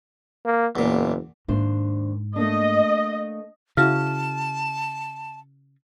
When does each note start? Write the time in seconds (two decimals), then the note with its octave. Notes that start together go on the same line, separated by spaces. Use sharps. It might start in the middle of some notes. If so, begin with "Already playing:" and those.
0.45 A#3
0.76 F#1 E2 A#2
1.48 D#2 G#2 D4 C5
2.36 A3 A#3 D4 D#5
3.77 C#3 E4 F#4 F5 A5 F6